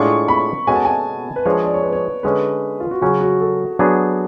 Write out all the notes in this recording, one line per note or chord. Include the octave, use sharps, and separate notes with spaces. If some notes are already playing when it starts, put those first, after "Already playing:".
Already playing: A2 G#3 D4 F4 G#4 C#6
B5
B2 G#3 C#4 F#4 A4 G#5
A5
G#5
B4
F3 G#3 D4 G#4 C#5
D5
C#5
B4
C#5
D3 G#3 C#4 B4
F4
F#4
C#3 F#3 C#4 G#4
F#4
A4
F#3 B3 D4 G#4